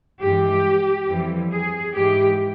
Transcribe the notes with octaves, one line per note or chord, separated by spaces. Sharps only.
G2 E3 G#3 G4
F2 E3 G3
G#4
G#2 E3 G#3 G4